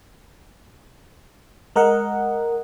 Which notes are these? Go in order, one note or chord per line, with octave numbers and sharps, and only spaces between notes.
G#3 A#4 D#5 F#5